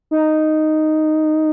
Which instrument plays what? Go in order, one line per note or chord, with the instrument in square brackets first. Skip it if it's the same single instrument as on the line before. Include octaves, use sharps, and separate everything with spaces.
[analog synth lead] D#4